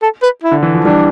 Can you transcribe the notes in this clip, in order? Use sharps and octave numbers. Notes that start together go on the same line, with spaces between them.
A4
B4
E4
D3
E3
F3
E3 G3 D4